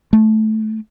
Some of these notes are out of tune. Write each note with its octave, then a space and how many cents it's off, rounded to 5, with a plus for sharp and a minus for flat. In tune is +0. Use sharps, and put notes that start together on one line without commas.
A3 -15